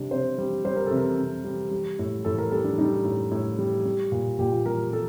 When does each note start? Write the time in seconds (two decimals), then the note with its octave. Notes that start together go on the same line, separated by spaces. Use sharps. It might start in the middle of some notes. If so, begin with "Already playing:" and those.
Already playing: C3 G3 C4 D4
0.11 C3 C5
0.38 G3
0.65 G3 C5
0.76 A#4
0.87 C3 A4
0.97 A#4
1.18 C3
1.44 G3
1.71 G3
1.99 A2
2.25 A2 A4
2.38 A#4
2.52 G3 A4
2.65 D4
2.78 G3 D#4
3.05 A2
3.31 A2
3.59 G3
3.85 G3
4.12 A#2
4.39 A#2 G4
4.52 F4
4.66 G3 A#4
4.92 G3 A4